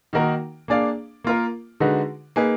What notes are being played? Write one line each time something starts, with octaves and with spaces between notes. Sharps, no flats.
D#3 A#3 D#4 F#4 A#4
A#3 D4 G#4 D5 F5
A#3 F4 A#4
D3 G#3 D#4 F#4 B4
A#3 D#4 G#4 B4